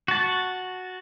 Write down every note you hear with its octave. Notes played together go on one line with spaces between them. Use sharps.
F#4 A5